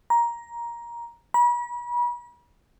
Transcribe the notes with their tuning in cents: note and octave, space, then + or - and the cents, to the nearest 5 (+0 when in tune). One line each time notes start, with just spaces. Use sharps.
A#5 +15
B5 -40